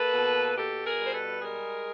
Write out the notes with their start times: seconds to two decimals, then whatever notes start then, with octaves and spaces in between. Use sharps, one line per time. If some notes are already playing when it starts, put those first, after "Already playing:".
Already playing: A#3 A4 B4
0.13 B2
0.56 B2 G4 A4
0.85 G#4 A#4
0.99 G3
1.06 C5
1.13 A4 B4
1.42 G#3 G#4 A#4